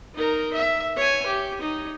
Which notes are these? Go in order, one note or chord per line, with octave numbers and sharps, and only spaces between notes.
D#4 A#4
E5
C#5 G#5
G4
D#4